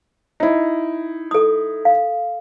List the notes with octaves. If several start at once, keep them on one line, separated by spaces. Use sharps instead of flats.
D#4 E4
A4 D#6
F5